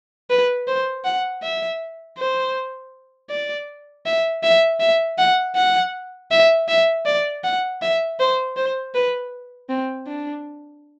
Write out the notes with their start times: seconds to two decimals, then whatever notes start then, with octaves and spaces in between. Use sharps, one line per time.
0.30 B4
0.67 C5
1.05 F#5
1.43 E5
2.18 C5
3.30 D5
4.06 E5
4.43 E5
4.80 E5
5.18 F#5
5.56 F#5
6.31 E5
6.69 E5
7.06 D5
7.44 F#5
7.82 E5
8.19 C5
8.56 C5
8.95 B4
9.70 C4
10.07 D4